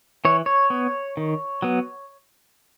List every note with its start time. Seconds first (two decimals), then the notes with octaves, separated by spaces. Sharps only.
0.25 E3 C#5
0.46 C#5
0.70 B3
1.17 D#3
1.62 F#3 B3